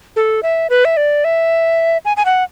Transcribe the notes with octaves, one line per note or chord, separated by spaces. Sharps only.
A4
E5
B4
E5
D5
E5
G#5
G#5
F#5